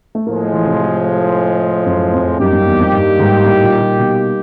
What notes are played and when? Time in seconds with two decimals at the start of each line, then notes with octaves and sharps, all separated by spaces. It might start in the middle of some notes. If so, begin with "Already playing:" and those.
0.15 A3
0.26 A2 F3 G#3 A#3
0.53 E3
0.67 C3
1.86 F#2
2.13 F2
2.39 F#2 G3 A#3 D#4 G4
2.53 F#2
2.66 E2
2.80 F2
2.92 G2
3.19 G#2
3.46 A2
3.64 A#2
3.81 A#2
3.99 B2